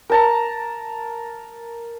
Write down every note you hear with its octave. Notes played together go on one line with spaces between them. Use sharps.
A#4 A5 A#5